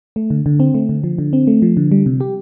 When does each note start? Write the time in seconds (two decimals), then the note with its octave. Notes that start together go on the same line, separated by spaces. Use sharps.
0.16 A3
0.30 D3
0.46 D3
0.60 C4
0.74 A3
0.89 D3
1.04 F3
1.18 D3
1.33 C4
1.47 A3
1.62 F3
1.77 D3
1.91 G3
2.06 C3
2.20 G4